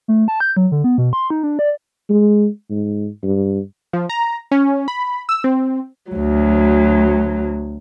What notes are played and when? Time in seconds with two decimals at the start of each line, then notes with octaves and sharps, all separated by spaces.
0.08 A3
0.28 A5
0.40 G6
0.57 F#3
0.72 D3
0.84 B3
0.98 B2
1.13 C6
1.30 D#4
1.43 D4
1.59 D5
2.10 G#3
2.70 G#2
3.23 G2
3.93 F3
4.09 A#5
4.51 C#4
4.88 B5
5.29 E6
5.44 C4
6.11 D2 F#3